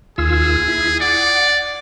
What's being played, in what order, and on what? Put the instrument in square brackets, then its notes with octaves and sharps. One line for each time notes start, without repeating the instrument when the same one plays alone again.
[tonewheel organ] D#2 F4 E6 [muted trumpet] G#4
[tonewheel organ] E4
[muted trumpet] D5 [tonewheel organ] F#5